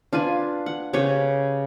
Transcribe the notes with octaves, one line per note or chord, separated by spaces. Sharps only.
D4 F4 B4 G#5
F#5
C#3 G4 B4 C#5